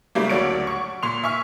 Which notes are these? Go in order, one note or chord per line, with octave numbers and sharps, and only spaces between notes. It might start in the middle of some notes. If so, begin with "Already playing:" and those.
C#3 G3 A3 A#3
D2 F#3 C#5 D5 D7
C#6
A#2 C6 F7
E5 G#5 C#6 F6